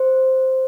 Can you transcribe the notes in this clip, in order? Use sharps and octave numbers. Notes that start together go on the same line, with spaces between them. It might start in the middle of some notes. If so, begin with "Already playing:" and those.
Already playing: C5